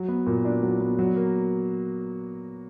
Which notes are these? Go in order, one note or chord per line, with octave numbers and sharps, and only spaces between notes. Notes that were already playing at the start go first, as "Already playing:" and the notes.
Already playing: F#3
B3
A#2
D4
F#3
B3
F#3
A#3